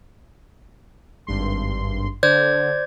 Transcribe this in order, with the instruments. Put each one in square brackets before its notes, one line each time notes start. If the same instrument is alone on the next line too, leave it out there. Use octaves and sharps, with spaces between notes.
[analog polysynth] G#1 G2 C6
[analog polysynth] D3 [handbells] C5 D5 G#6